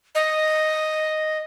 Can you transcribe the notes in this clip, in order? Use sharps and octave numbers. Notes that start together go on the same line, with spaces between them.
D#5